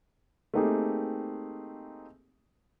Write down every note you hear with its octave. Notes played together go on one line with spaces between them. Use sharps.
A3 A#3 C4 D#4 G4 G#4